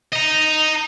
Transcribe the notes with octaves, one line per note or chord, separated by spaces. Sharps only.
D#5 A#5